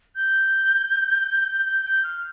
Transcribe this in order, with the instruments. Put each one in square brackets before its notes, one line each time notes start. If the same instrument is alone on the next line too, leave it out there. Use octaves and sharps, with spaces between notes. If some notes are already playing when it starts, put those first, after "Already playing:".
[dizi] G6
G6
G6
F6